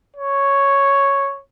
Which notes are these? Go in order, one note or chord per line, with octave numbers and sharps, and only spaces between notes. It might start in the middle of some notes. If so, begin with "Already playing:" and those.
C#5